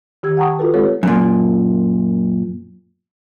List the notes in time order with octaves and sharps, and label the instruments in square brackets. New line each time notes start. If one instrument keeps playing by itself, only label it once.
[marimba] D#3 G4 E6 G#6
F#5 G5 A5 A#5 C#6 D#6
F4 F#4 A4 B4
G#3 C4 G4 A4 B4 C#5
[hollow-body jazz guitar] F#2 A#2